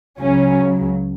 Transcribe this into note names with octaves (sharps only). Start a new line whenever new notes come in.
C#2 C#3 F#3 C#4